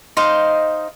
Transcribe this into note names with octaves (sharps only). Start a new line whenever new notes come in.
D#4 C5 D#5 F5